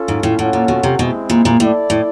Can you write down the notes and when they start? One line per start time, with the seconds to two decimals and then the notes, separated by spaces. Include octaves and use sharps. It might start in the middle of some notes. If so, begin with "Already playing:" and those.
Already playing: C#4 F4 A4
0.08 G#2
0.23 A2
0.38 A2 C#4 F4 A4 C#5 F#5
0.53 A#2
0.68 B2
0.83 C3
0.99 B2 G#3 C4 E4
1.30 A#2
1.45 A#2
1.59 A2 E4 A4 D5
1.90 A2